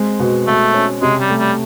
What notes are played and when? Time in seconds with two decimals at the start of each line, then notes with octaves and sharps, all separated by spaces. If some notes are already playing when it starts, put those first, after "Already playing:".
Already playing: G#3 C4
0.20 B2
0.47 B2 A3
0.74 C#4
1.02 C3 G#3
1.21 G3
1.30 A3
1.39 G3